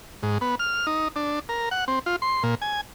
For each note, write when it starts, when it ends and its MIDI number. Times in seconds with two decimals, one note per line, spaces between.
0.23 0.38 44
0.41 0.55 59
0.59 0.86 89
0.87 1.08 63
1.16 1.39 62
1.49 1.69 70
1.71 1.85 78
1.88 1.99 60
2.06 2.16 65
2.22 2.43 84
2.43 2.55 46
2.62 2.81 80